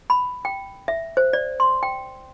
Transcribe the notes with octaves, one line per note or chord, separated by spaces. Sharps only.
B5
G5
E5
C5
D5
C6
G5